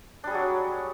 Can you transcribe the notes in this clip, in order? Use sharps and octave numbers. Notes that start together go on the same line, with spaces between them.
F#3 G3 D4 G#4